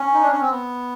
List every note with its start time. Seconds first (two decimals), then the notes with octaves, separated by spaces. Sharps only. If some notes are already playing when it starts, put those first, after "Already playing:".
Already playing: C#4
0.13 D#4
0.22 D4
0.31 C#4
0.41 C4
0.50 B3